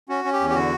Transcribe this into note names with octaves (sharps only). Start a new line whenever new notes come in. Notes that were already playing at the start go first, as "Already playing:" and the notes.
C#4 F#4
C#4
G4
E2
G4
D3 F#4